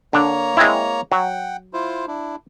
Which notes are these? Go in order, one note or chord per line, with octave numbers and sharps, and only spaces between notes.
D3 A#3 D4 C#5 A#5
G#3 C4 E4
F#3 F#5 G5
E4 F4 C5
D4 E4